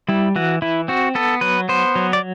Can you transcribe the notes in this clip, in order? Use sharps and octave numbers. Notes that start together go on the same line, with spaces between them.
G3 E4
E3 F#4
E3 E4
C4 F#4
B3 A4
F#3 B4
B3 C5
F#3
D5